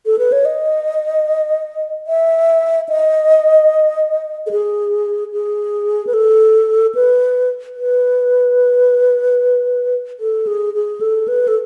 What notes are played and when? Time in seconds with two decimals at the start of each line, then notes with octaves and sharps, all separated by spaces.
0.06 A4
0.19 B4
0.32 C#5
0.45 D#5
2.07 E5
2.89 D#5
4.47 A4
4.51 G#4
5.33 G#4
6.07 B4
6.14 A4
6.95 B4
7.76 B4
10.20 A4
10.47 G#4
10.74 G#4
11.01 A4
11.28 B4
11.48 A4